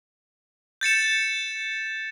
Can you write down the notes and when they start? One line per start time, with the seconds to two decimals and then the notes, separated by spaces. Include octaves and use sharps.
0.81 G6 A6 C#7 E7